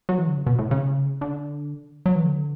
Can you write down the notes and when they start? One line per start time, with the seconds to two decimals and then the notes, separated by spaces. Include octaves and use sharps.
0.09 F#3
0.18 E3
0.27 D3
0.37 C#3
0.47 B2
0.59 A2
0.71 C#3
1.21 D3
2.06 F#3
2.15 E3
2.24 D3